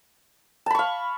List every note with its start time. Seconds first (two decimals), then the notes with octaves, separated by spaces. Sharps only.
0.66 A5
0.70 B5
0.75 C#6
0.79 F5